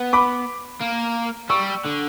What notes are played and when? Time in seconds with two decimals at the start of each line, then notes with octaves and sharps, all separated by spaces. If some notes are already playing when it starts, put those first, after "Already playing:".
Already playing: B3
0.13 B5 D6
0.81 A#3
1.49 G3 C#6 E6
1.85 D3